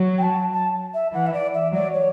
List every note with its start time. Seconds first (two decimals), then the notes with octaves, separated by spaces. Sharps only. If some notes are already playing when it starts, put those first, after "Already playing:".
Already playing: F#3
0.17 G5
0.22 A5
0.52 A5
0.93 E5
1.13 E3 F#5
1.26 E5
1.33 D5
1.53 E5
1.73 F#3 D5
1.93 C#5